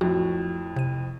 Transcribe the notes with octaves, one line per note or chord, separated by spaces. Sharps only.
F2 A2 F#4
C3 D#7